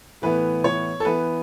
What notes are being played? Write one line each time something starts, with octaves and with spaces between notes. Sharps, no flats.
A2 E3 B3 B4
C#5
A4
E3 B3 B4